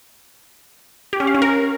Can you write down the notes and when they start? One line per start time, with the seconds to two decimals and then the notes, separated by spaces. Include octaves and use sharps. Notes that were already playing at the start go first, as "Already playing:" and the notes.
1.13 G4
1.20 C#4
1.27 F5
1.34 C#4
1.42 A#4